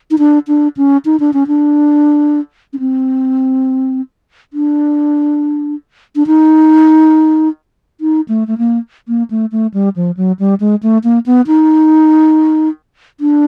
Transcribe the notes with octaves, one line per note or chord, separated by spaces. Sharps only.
D#4
D4
D4
C#4
D#4
D4
C#4
D4
C#4
C4
D4
D4
D#4
D#4
A3
A3
A#3
A#3
A3
A3
G3
F3
F#3
G3
G#3
A3
A#3
B3
D#4
D4